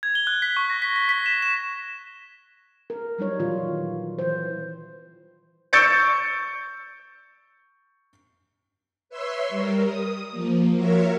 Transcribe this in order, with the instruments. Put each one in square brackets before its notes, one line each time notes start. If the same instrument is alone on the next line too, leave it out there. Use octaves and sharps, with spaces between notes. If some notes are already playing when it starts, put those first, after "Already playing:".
[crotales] G#6
G7
F#6
B6
C#6
A#6
B6
B6
B6
E7
E7
[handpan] A#4
F#3 G3 D#4 C#5
A#2 D#3 E3 F#3 F4
E3 C5
[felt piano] C#6 E6 G6 A6 C#7 D7
[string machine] B4 C#5 E5 C6 E6
G3 A#4
D#6
F3 A#3
F4 F#4 A#4 C#5 E5